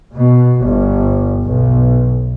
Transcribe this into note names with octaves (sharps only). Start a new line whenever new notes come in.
B2
G1
B1